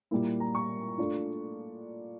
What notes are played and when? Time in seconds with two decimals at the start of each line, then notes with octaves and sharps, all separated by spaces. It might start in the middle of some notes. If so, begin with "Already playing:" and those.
0.11 A#2 G3 A#3 E4
0.40 A#5
0.55 C#6
0.98 A3 D4 F4